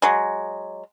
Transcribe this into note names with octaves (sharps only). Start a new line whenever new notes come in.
F#3 G#3